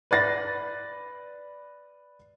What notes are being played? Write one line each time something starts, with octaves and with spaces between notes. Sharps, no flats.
B4 D5 A6 A#6